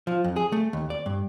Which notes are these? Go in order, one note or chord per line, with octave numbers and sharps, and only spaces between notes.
F3
F2
G#4
A3
D#2
D5
G2